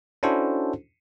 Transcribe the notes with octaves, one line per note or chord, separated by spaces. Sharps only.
C#4 D4 E4 F#4 A4 C5